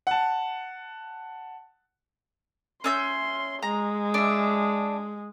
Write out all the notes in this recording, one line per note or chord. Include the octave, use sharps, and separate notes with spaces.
F#5 A5
C#4 E5 C6 G6
G#3 A#5
D4 E5